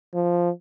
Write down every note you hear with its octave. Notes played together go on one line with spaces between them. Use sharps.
F3